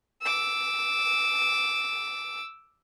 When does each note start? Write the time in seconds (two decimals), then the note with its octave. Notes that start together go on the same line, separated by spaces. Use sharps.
0.23 D6 E6